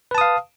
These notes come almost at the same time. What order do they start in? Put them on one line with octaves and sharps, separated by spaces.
B4 A5 D#6 F5